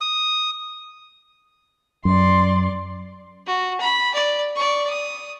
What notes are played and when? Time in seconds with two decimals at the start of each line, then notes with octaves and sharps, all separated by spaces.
0.01 D#6
2.05 F#2 D5 C6
3.47 F#4
3.80 B5
4.14 D5
4.55 D5 C#6
4.90 D#6